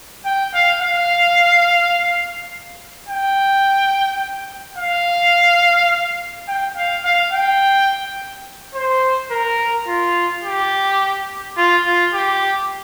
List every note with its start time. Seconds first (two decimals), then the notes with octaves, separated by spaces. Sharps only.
0.25 G5
0.54 F5
0.81 F5
3.09 G5
4.78 F5
6.48 G5
6.76 F5
7.04 F5
7.33 G5
8.75 C5
9.31 A#4
9.87 F4
10.44 G4
11.57 F4
11.85 F4
12.14 G4